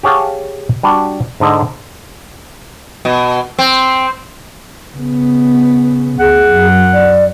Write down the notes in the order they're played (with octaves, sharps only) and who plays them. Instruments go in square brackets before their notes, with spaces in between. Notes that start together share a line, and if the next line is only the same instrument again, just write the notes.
[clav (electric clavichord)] G4 G#4 C#5 F5 F#5 A5
G3 D4 F#4
G#2 D3 D#5
[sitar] B2
C4
[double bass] C#3 B3
[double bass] D2 [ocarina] G#4 [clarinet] F#5
[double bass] F#2
[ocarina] D5